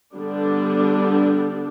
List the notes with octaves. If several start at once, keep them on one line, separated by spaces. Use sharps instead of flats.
D3 G3 B3 D4